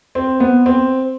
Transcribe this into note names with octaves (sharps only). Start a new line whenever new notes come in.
C4
B3
C4